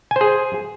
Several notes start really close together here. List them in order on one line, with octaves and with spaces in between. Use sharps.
G#5 C5 G#4